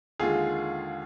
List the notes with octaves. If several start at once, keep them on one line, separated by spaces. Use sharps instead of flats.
D#2 D3 G#3 F4 G#4